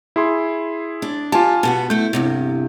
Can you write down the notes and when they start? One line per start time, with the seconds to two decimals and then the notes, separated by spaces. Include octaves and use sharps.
0.16 E4 G#4 C6
1.02 D4
1.32 F4 G4 G#5 A5
1.63 B2 B3 F#4 A5
1.90 A3 E4 G6
2.13 E2 G2 C3